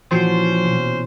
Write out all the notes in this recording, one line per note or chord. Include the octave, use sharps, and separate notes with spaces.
A#2 E3 F3 C#4 F#4 C5
B2